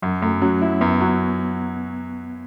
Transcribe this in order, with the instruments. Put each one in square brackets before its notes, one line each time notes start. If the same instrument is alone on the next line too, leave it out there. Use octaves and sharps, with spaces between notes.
[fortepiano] F#2 [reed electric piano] F#3
[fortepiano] F#2 [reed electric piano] A3
[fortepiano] F#3 [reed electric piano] C#4
[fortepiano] E4
[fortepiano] F#2 [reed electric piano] B3
[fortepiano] F#3